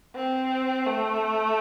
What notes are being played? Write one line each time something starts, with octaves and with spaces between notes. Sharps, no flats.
C4
A3